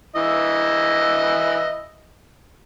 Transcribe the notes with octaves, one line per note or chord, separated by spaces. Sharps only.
E3 D#5 E5